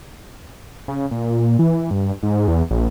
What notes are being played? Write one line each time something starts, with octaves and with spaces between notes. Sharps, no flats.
C#3
A#2
E3
G2
G#2
E2
A#1